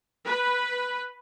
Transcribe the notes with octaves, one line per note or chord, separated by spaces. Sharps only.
B4